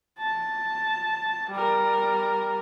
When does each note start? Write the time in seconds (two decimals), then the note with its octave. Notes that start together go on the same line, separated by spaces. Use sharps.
0.19 A5
1.50 G3 A#4